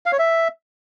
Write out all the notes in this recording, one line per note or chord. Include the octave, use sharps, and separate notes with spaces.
F5
C#5
E5